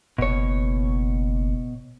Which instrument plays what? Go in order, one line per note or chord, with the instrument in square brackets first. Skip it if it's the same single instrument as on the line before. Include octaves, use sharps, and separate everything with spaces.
[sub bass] F#1 [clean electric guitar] B2 C#5